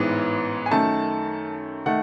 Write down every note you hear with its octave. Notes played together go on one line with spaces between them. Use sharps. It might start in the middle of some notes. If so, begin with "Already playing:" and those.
Already playing: A1 G#2 E3 B3
G#5
F#2 D#3 A3 A5
D#3 A3 F#5